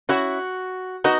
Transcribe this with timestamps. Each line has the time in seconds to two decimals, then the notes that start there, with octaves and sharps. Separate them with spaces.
0.09 C#4 E4 F#4
1.04 B3 D#4 F#4